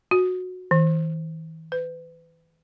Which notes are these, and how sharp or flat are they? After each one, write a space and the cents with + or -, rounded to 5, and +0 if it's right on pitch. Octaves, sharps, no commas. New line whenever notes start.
F#4 -15
E3 -45
B4 +35